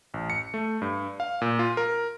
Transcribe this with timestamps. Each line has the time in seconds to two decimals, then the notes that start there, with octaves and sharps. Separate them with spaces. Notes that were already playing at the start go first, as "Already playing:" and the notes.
0.14 A1
0.30 C#7
0.54 A3
0.82 G2
1.20 F5
1.41 A#2
1.59 F4
1.77 A#4